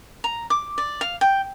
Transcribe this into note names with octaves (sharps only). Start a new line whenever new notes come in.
A#5
D6
D5
F5
G5